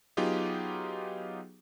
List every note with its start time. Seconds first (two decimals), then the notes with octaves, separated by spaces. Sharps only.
0.17 F#3 B3 D#4 F4 G4 G#4